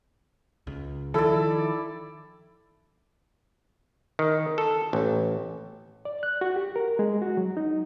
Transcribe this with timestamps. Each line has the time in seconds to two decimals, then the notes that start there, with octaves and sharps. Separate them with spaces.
0.67 C#2
1.14 D#3 F3 E4 A4 D5
4.19 D#3
4.58 A4
4.93 A1
6.05 D5
6.23 F#6
6.41 F#4
6.56 G4
6.76 A#4
6.99 G#3
7.22 F#4
7.37 F#3
7.57 D#4